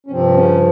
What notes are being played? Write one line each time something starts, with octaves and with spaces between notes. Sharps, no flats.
C#4
G2 C3 F3 C4
C#3 C#4